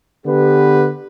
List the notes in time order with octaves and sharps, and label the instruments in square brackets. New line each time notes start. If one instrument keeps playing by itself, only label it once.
[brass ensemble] D3 B3 G4 B4